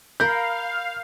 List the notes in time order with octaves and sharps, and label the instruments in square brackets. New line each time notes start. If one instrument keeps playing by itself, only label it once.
[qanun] A#4 B5 [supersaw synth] F5 [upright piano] G6